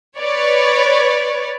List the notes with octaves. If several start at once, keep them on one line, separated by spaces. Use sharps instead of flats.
B4 C#5 D5